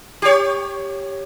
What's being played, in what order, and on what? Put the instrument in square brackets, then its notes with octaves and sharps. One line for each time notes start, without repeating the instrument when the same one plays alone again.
[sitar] G4 C#5